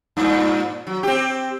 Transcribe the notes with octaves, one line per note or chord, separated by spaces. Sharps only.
G2 A#2
F#3
C4 G4